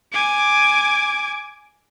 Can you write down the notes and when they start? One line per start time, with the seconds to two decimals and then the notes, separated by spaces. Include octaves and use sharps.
0.12 G#5 D6